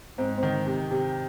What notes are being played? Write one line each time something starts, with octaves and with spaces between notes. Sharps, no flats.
G#2 C4
C4
D#3
C3
C3